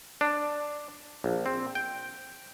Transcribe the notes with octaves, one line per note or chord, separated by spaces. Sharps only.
D4
A#1
C4
G5